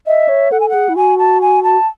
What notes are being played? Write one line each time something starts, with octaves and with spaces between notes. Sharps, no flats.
D#5 E5
C#5
A4 F#5
G#5
G#4 F#5
E4
F#4 G#5
A5
G#5
A5